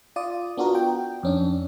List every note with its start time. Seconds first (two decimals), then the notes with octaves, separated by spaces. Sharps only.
0.16 F4 D5 D#6
0.57 B3 D4 F4 F#4 A#4
0.75 G5
1.23 F2 C#4 D4